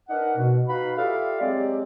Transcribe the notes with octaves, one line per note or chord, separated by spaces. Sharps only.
D4 D#4 A#4 B4 F#5
B2
D#4 F#4 B4 F5 F#5 B5
F4 G4 A4 D5 E5 F5
F#3 G#3 C4 G4 D5